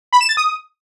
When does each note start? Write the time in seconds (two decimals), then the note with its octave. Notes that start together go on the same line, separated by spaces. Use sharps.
0.13 B5
0.21 E7
0.29 A6
0.37 D#6